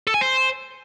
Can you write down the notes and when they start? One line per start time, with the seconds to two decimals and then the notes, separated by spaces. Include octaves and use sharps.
0.07 A4
0.14 G#5
0.21 C5